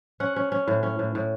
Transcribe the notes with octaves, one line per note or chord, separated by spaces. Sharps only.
C#4 F#5
C#4
C#4
A2
C#4
A2
A2